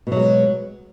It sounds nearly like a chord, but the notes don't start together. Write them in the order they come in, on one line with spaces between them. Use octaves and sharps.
B2 F#3 G#3